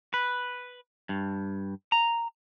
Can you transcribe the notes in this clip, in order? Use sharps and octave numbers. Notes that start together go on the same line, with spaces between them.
B4
G2
A#5